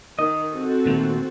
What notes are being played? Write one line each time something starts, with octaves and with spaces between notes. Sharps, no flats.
D#3 D#5
C4 F#4 A4
A#2 D#3 A3